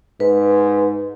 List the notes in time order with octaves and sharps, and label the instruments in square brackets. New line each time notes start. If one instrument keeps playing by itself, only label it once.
[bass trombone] G#2 [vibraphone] B4